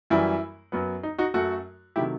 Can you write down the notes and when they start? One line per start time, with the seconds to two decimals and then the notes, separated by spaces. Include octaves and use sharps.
0.10 F#2 E3 G3 E4
0.72 F#2 F#3 B3
1.03 D#4
1.18 D#4 F#4
1.34 F#2 F#3 A3 F#4 A4
1.96 C3 D#3 F#3 A3 E4 G4